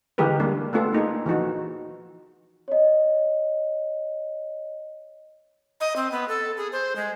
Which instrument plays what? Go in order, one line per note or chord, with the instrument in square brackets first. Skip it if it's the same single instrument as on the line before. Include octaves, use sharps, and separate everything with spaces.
[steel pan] D3 E3 G#3 G4 A#4 B4
G3 A#3 D4
A3 B3 D4 F4 A4
A#3 D#4 F4 G#4
E3 F3 D#4 F#4
[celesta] C#5 D#5
[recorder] D#5
C4
B3
A4
G#4
C5
G#3